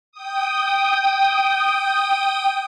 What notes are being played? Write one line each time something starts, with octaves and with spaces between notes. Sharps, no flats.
G5 D#6